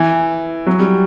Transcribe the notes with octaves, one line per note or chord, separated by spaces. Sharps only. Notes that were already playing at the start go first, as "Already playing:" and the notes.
Already playing: E3
F#3
G3